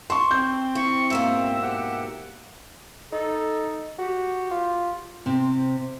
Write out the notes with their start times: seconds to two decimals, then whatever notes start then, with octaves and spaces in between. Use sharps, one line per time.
0.10 A5 C6 C#6
0.31 C4 G6
0.75 E4 C#6
1.10 G#2 B2 A#3 E5
1.62 G4 F#5
3.12 D#4 A4
3.99 F#4 G4
4.51 F4
5.26 C3 C4